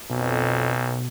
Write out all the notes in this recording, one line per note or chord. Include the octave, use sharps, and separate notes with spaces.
B1 F2 B2